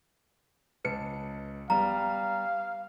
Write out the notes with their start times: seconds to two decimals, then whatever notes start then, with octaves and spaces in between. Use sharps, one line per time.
0.85 C#2 B4 A5 C#7
1.70 G3 B3 F5 A#5